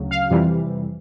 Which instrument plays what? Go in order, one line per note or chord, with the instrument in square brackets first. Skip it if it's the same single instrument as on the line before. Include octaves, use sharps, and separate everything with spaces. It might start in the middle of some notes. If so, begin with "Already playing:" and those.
Already playing: [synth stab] D2 C#3 F#3
F5
F2 C3 E3 G3